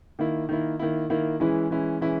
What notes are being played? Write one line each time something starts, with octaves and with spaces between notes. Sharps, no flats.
D#3 A#3 E4
D#3 A#3 E4
D#3 A#3 E4
D#3 A#3 E4
E3 G#3 C#4 E4
E3 G#3 C#4 E4
E3 G#3 C#4 E4